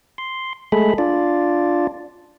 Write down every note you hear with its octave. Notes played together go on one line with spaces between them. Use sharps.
C6
G#3 A3 G#4 A4 B5
D4 F4 D5